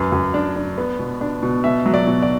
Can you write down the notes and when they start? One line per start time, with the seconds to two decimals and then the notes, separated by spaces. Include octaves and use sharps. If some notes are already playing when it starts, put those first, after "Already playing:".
Already playing: F#2 B4
0.12 F#2
0.34 D4
0.56 D4
0.78 B3
0.99 B2
1.21 D4
1.43 B2
1.64 B2 E5
1.86 F#3
1.94 D5
2.07 B2
2.22 D5